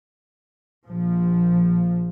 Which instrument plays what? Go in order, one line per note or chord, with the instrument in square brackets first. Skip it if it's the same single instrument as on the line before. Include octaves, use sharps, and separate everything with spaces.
[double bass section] A#1 F3